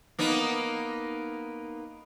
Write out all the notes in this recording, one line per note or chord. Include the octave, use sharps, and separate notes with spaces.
A#3 B3 D#4